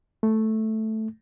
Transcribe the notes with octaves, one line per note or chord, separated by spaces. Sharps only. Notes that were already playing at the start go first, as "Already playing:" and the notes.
A3